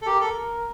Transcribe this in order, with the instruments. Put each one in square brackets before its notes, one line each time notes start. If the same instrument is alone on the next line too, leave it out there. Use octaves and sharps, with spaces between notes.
[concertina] A4
[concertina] G4 [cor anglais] A#4
[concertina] A4